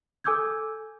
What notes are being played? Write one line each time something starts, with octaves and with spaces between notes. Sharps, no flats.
A4 G#5 D6 E6 G6 G#6